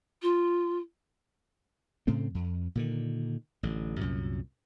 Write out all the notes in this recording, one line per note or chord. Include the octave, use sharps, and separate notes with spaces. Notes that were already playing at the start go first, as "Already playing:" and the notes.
F4
A2 C#3 A3 C4
F2
A#2 D3 D#3
A1 D3
C2 F#2 A#2